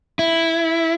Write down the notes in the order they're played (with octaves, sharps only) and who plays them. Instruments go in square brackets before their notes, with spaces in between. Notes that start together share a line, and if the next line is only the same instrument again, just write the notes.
[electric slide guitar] E4